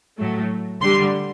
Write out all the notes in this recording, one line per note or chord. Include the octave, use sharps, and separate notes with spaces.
A2 F#3 A3
D3 G3 C6